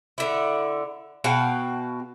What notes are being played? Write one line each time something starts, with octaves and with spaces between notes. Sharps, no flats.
D3 E4
B2 F#4 F5 G5